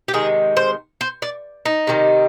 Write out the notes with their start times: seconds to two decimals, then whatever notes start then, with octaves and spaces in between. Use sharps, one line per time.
0.08 G4
0.13 C3 D#3 G#3 G#4
0.57 C5
1.01 C5
1.22 D5
1.66 D#4
1.87 C3 D#3 G3